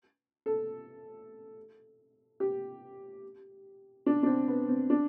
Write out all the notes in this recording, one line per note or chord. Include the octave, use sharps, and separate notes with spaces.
A4
G4
D4
D4
C4
B3
C4
D4